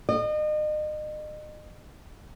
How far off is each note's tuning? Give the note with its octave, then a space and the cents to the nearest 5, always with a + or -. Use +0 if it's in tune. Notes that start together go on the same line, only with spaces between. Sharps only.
D#5 -35